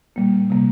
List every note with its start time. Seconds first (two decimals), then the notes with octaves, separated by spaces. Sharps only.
0.16 A#2 G3 A#3
0.50 C3 G3 A#3